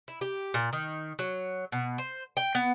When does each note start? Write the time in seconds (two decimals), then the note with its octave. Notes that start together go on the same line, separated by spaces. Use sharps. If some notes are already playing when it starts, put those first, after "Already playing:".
0.08 E4
0.21 G4
0.54 A#2
0.73 D#3
1.19 F#3
1.72 B2
1.98 C5
2.37 G5
2.55 B3